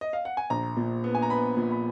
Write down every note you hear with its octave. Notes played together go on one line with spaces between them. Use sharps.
D#5
F5
F#5
G#5
A#1 A#5
A#2
B3
G#5
A#5
B3 B5
A#2
B5